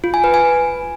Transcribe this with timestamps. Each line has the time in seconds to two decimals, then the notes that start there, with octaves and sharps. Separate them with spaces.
0.04 F4
0.14 G#5
0.24 B4
0.34 G#5